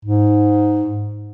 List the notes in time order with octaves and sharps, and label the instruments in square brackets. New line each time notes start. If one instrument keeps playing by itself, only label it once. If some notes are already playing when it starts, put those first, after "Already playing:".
[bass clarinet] G#2